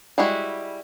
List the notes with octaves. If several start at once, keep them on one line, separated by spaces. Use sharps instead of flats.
G3 G#3 E4 F#4